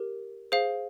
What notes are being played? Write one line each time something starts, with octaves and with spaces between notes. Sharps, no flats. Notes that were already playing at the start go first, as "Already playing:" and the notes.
Already playing: G4 A#4
G#4 C5 F5